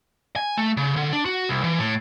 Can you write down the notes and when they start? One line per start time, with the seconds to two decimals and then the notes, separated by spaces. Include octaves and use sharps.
0.36 G#5
0.58 A3
0.77 C#3
0.96 D3
1.13 D4
1.26 F#4
1.49 C2
1.64 E3
1.79 A2